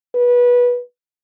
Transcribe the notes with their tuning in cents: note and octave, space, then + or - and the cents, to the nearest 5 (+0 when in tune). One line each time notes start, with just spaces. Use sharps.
B4 -20